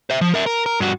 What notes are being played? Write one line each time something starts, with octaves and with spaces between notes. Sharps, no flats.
C5 E5
F3
A#4 E5
A#4
A#4
G2 F#4